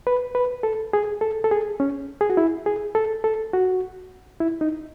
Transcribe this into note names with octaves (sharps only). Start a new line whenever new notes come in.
B4
B4
A4
G#4
A4
A4
G#4
C#4
G#4
F#4
E4
G#4
A4
A4
F#4
E4
D#4